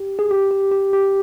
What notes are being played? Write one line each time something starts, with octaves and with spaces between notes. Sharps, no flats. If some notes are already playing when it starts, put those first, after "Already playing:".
Already playing: G4
G#4
G4
G4
G4
G4